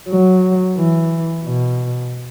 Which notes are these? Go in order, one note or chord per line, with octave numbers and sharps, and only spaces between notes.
F#3
E3
B2